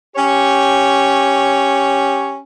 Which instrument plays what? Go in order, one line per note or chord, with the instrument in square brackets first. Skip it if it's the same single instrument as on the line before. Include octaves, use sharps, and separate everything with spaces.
[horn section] C#4 G4 C#5